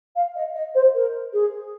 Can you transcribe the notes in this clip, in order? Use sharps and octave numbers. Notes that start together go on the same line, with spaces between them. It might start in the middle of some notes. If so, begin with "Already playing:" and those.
F5
D#5
D#5
C5
A#4
G#4